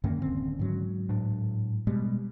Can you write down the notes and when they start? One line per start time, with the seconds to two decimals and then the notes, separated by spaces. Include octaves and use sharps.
0.04 F#2 D3 D#3 A#3 C#4
0.22 D1 C4
0.59 G#2 F#3
1.09 A2 D4
1.87 B2 G3 G#3